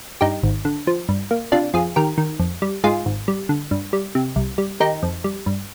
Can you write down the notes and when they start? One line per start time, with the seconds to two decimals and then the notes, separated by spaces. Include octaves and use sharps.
0.21 G2 D#4 G4
0.43 G#1
0.65 D3
0.87 F3
1.09 G2
1.31 A#3
1.52 C3 D4 F4
1.74 F2 F4 G#4
1.96 D#3 G4 A#4
2.18 D#3
2.39 F2
2.62 G3
2.84 G#2 F4 G#4
3.06 G#1
3.28 G3
3.49 D3
3.71 G2
3.93 G3
4.15 C3
4.36 C2
4.58 G3
4.80 D#3 D#4 G4
5.03 F2
5.24 G3
5.46 G2